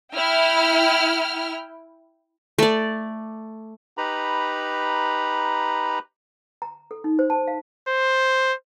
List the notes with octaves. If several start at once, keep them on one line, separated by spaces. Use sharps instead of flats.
E4 G5 F6
A3 D5
D#4 G4 B4 A#5 B5
A#5
A4
D#4
C5
A5
F5
C5